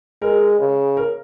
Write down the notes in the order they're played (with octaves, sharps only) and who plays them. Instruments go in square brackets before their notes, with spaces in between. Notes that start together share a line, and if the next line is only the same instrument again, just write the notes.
[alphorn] G#3 [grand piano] A#4
[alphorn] C#3
[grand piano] A#4